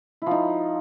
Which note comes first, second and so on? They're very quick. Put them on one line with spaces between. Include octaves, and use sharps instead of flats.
E4 F3 D#4